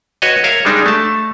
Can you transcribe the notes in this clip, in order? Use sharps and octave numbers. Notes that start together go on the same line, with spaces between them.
F#4 B4 C#5 D#5
A#4 C#5 E5 F5
G3 G#3 D4 D#4
A3 A5